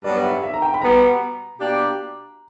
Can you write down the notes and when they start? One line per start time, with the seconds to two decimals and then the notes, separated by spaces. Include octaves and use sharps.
0.04 G2 F#3 B3 D5
0.24 E5
0.43 E5
0.54 A#5
0.62 G5
0.74 B5
0.82 B2 G3 B3 A#5
1.58 B2 A#3 D4 G4